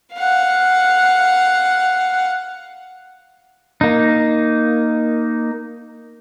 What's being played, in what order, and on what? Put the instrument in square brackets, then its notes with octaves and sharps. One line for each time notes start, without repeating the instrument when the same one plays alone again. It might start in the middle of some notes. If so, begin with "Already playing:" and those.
[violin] F5 F#5
[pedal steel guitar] A#3 D#4